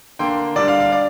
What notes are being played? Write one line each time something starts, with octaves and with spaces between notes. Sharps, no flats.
D3 A#3 D4 G5 C6
D3 G3 D4 D5
F5
F5
D4 D5